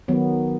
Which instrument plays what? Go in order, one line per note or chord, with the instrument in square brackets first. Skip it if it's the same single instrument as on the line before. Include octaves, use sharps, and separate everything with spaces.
[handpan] D#3 F#3 B3